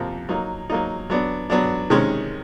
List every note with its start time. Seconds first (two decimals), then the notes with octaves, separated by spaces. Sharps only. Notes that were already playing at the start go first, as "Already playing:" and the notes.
Already playing: F2 C3 F3 A#3
0.29 F#3 A#3 D#4
0.70 F#3 A#3 D#4
1.10 F#3 B3 D4
1.50 F#3 B3 D4
1.90 C3 D#3 G#3 C#4